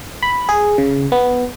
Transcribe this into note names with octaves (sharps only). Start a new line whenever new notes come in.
B5
G#4
C#3
B3